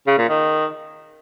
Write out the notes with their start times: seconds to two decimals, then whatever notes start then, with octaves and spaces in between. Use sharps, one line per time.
0.07 C#3
0.18 A#2
0.29 D#3